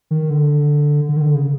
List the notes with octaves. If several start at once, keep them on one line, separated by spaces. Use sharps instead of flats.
D#3
D3
D3
D#3
D3
C#3